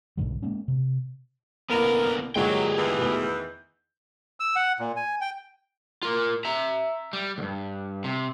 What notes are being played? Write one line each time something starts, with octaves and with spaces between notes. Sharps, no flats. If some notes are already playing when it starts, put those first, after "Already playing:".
B1 G#2 D3 G3
G#3 A#3 C#4
C3
C2 D3 A#3 B3 A#4 B5
G2 A#2 D3 F#3 G#3 G4 G#4 G5
E2 D#3 E3
B2 A3 G7
G6
E6
F#5
A#2
G#5
G5
F4 A#4
E5 A#5
G3
D2 G2
C3